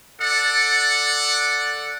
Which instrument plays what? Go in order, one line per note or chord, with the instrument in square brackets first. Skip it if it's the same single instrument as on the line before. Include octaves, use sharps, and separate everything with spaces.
[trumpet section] A4 D5 F#5